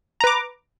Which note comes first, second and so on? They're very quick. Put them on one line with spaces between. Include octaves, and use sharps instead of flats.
A#5 B4 D6